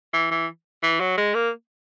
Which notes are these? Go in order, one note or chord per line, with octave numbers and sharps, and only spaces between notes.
E3
E3
E3
F#3
G#3
A#3